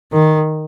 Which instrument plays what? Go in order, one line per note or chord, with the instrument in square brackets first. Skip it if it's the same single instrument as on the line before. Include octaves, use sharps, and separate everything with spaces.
[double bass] D#3